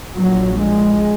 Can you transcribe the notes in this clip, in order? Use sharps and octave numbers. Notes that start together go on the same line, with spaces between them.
A#1 A#2 F#3
G#3